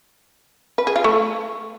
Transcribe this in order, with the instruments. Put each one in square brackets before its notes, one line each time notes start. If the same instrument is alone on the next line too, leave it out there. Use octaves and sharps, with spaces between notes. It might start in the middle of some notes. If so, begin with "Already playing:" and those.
[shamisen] B4
G#4
F4
A3